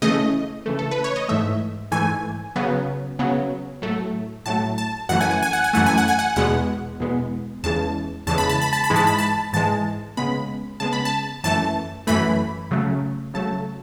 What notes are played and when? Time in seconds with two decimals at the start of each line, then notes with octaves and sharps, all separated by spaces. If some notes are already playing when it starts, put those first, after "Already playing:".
0.02 C#3 E3 A3 D#5
0.66 C#3 E3 A3
0.79 A4
0.91 B4
1.04 C#5
1.16 D#5
1.29 G#2 E3 A3 E5
1.92 G#2 E3 A3 G#5
2.56 C#3 F#3 B3
3.19 C#3 F#3 B3
3.82 A2 F#3 A3
4.46 A2 F#3 A3 A5
4.78 A5
5.09 F#2 E3 A3 F#5
5.21 G#5
5.31 F#5
5.43 G#5
5.53 F#5
5.64 G#5
5.73 F#2 E3 A3 F#5
5.86 G#5
5.98 F#5
6.08 G#5
6.19 F#5
6.36 E2 B2 G#3 B3 F#5
7.00 E2 B2 G#3 B3
7.63 E2 C#3 E3 G#3 A5
8.27 E2 C#3 E3 G#3 A5
8.38 B5
8.49 A5
8.62 B5
8.73 A5
8.84 B5
8.90 G#2 E3 G#3
8.96 A5
9.07 B5
9.18 A5
9.53 G#2 E3 G#3 A5
10.17 C#3 G#3 B3 B5
10.80 C#3 G#3 B3 A5
10.93 B5
11.05 A5
11.44 F#2 E3 A3 A5
12.07 F#2 E3 A3 B5
12.71 C#3 F#3 A3
13.34 C#3 F#3 A3 A5